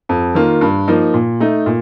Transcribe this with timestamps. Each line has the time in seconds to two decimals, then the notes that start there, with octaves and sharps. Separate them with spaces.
0.09 F2
0.35 D#3 A#3 F4
0.61 G2
0.88 F3 A#3 D#4
1.14 A#2
1.40 A3 D#4
1.66 A#2